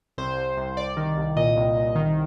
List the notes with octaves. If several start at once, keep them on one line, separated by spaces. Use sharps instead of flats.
C2 C5
C2
C2
C2 D5
D#3
C2
A#2 D#5
C2
C2
D#3